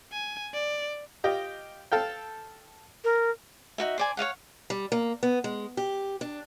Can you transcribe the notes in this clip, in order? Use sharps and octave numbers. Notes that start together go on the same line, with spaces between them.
G#5
D5
F4 G4 D#5
A4 F5 G5
A#4
D#4 F#4 E5
C5 D5 G#5
C#5 D#5 F5 F#5
G3
A#3
B3
G#3
G4
D4